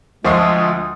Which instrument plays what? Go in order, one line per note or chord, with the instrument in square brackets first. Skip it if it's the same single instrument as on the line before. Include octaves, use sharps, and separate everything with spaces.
[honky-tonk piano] D2 E5 D#6 [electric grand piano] F3 C#6 C7 [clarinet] G#3 [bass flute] F4